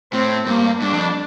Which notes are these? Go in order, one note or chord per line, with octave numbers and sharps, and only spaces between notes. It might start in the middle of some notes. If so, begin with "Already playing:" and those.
A2 C4
G2 A#3
G2 D4
F2